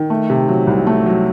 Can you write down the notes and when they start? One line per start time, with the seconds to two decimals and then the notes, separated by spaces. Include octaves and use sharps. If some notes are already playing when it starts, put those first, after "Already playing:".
Already playing: D#3
0.10 A3
0.30 C3
0.49 F#3
0.67 C2
0.87 A3
1.06 F#3